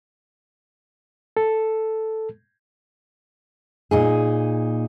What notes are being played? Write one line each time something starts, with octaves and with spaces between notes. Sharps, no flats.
A4
A#2 D#4 G#4